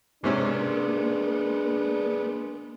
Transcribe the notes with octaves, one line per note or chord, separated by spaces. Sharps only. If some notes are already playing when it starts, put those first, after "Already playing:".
G#2 C3 G#3 A#3 B3 C#4 D4